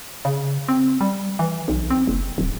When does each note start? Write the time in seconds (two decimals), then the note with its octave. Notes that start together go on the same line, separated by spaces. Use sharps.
0.25 C#3
0.68 C4
1.01 G3
1.39 E3
1.68 B1
1.90 C4
2.07 F#1
2.38 D1